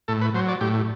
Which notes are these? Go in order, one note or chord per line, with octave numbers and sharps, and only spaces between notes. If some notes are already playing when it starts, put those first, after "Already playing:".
A2 A4
B4
F#3 C5
D5
A2 G4